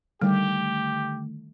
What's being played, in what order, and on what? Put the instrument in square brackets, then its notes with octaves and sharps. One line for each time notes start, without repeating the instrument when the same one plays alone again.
[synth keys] D3 D#3 A3 [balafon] G3 [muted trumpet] G4